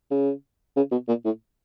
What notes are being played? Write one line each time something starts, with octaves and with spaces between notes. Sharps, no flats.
C#3
C#3
B2
A#2
A2